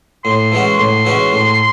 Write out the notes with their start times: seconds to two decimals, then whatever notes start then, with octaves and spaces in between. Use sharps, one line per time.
0.24 A2 C6
0.52 E3 G#3 C#4 F#4
0.78 A2 C6
1.05 E3 G#3 C#4 F#4
1.33 A2